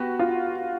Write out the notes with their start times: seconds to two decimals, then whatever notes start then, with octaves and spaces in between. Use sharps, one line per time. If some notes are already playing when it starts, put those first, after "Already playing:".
Already playing: B3 F#4 G4
0.19 F4